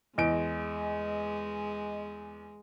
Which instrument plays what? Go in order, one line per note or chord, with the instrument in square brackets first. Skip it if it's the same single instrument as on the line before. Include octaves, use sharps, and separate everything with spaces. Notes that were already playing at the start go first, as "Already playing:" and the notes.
[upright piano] E2 D7 [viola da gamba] G#3 [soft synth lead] D#5